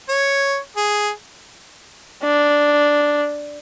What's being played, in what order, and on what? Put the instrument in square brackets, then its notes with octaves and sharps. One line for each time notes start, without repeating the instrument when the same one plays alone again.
[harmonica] C#5
G#4
[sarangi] D4